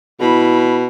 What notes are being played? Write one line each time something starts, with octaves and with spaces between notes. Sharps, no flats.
B2 E4 B5